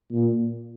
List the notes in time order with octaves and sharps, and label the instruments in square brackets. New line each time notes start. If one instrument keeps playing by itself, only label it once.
[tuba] A#2